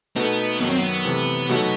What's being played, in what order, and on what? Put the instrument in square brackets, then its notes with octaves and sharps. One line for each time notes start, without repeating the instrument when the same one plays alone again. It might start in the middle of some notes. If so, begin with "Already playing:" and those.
[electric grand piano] B2 A3 D#4 [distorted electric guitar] B3
[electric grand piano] F#2 D#3 F#3 [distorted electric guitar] B3
[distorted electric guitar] C4
B3
[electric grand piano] C3 E3 A3
[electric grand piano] B2 F#3 A3 D#4 F#4 [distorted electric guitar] B3